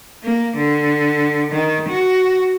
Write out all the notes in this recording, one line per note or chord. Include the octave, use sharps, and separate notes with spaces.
A#3
D3
D#3
F#4